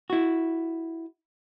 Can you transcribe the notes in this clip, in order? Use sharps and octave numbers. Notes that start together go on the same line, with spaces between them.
E4 F#4